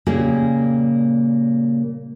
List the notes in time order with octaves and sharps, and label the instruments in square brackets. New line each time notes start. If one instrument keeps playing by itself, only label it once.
[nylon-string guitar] A#2 C#3 G3 A#3 G4 G#4